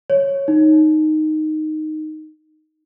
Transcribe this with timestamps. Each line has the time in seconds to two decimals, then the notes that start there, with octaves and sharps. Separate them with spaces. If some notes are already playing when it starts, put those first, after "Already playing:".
0.10 C#5
0.48 D#4